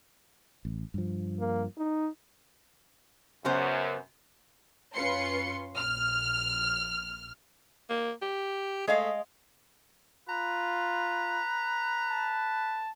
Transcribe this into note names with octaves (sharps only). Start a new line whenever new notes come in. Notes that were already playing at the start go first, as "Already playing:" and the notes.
A1
G2 F3
A#3
D#4
F#2 C#3 B3 C5
F#2 C#4 F4 B4 C6 C#7
A#1 F6
A#3
G4
G#3 A3 D#5 F5
F4 B4 A#5
A5